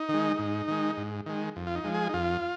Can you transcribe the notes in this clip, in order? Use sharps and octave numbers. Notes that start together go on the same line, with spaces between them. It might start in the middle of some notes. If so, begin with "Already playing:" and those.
Already playing: D#4
D#3 G#3
G#2
D#3 G#3
G#2
D#3 G#3
F2
F4
D#4
F3 G#3
G#4
D#4
F2 F4